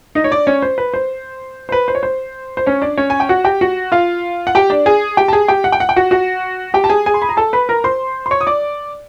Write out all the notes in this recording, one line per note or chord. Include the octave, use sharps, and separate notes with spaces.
D#4 D#5
C#5
D4 D5
C#4 C#5
C5
B4
C5
C5
B4
C5
C#5
C5
C5
C#4 C#5
D4 D5
C#4 C#5
G#5
G5
F#4 F#5
G4 G5
F#4 F#5
F4 F5
F#5
G4 G5
D4 D5
G#4 G#5
G4 G5
A5
G#4 G#5
G4 G5
F#5
G5
F#5
G5
F#4 F#5
F#4 F#5
G4 G5
A5
G#4 G#5
G#4 G#5
C6
B5
A#5
A4 A5
B4 B5
A#4 A#5
C5 C6
C6
C#5 C#6
D#6
D5 D6